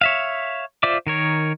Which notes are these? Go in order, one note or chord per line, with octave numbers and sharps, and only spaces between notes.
C#5 E5 F5
F4 C5 D5 E5 D6
D#3 A#4 C#5